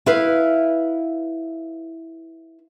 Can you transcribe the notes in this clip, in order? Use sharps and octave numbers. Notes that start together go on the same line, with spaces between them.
E4 B4 F5